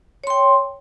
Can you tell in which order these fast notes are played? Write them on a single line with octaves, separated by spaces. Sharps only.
C#5 C6 G5